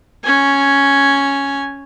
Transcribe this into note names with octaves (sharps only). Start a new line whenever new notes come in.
C#4 G#5